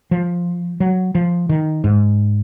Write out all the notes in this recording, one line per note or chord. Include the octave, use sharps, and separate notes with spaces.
F3
F#3
F3
D#3
G#2